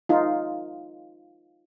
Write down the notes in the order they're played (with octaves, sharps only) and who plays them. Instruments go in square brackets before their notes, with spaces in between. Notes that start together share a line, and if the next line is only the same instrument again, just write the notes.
[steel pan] D#4 F4